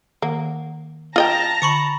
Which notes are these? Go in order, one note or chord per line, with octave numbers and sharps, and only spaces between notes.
D#3 A#3 F#5
F4 D#5 G5 A5 A#5 A#6
D3 B5 C#6 C#7